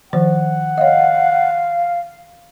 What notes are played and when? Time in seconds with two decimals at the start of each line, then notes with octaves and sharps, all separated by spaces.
0.13 D#3 F3 C5 F#5
0.78 C#5 D#5 F5